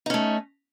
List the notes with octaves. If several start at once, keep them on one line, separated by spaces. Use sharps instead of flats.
A3 C#4 D#4